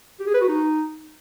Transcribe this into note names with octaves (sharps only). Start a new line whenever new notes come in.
G4
G#4
B4
F#4
D#4